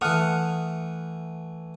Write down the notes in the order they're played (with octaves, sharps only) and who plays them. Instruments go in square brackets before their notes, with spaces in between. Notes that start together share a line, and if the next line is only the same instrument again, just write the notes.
[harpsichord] E3 A3 [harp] F#5 D#6 F6